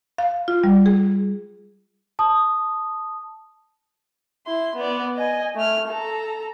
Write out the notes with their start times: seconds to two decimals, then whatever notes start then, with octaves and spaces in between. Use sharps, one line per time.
0.18 F5
0.48 F4
0.64 G3
0.86 G#4
2.19 A5 D#6
4.46 E4 C6
4.76 B3 D5
5.17 D#5 G#5
5.55 A3 F6
5.88 A4 A#5